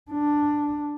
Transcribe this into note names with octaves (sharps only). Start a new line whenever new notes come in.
D4